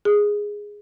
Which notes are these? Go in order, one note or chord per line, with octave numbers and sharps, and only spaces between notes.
G#4